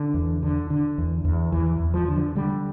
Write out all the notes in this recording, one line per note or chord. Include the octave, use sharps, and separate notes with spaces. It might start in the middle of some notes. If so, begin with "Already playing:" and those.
Already playing: D3
E2
D3
D3
E2
E2
E2 E3
E2
F3
D3
D3 G3